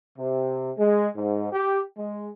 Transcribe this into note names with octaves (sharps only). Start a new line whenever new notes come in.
C3
G#3
G#2
G4
G#3